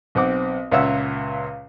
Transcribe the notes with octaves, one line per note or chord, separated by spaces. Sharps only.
B1 C4 F#5 D6
C#2 A#2 C#5 E5 F#5 E6